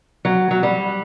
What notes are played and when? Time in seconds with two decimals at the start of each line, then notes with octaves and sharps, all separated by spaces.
0.25 F#3
0.51 F#3
0.63 G3